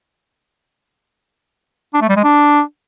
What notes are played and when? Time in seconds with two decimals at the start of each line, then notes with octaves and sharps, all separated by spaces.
1.94 D4
2.01 A3
2.09 G3
2.16 G#3
2.24 D4